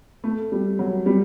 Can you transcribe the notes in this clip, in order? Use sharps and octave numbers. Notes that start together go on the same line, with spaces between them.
A3
G3
F#3
G3